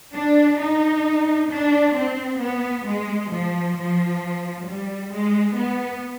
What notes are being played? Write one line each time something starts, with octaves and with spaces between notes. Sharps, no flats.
D4
D#4
D4
C4
B3
G#3
F3
F3
G3
G#3
B3